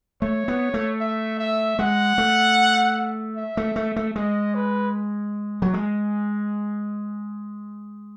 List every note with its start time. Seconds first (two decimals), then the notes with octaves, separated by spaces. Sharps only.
0.21 A3 C#5
0.48 B3
0.74 A3
1.00 E5
1.39 E5
1.79 G#3 F#5
2.18 A3
3.37 E5
3.57 A3
3.76 A3
3.96 A3
4.16 G#3 D#5
4.55 B4
5.62 F#3
5.74 G#3